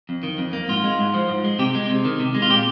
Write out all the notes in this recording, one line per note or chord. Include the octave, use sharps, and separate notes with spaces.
F2
D#3
F2
A#3
G#2 F4
G#3
G#2
F3
G#2
G#3
C3 G4
G#3
C3
D#3
C3
G#3
F4
A#2 G4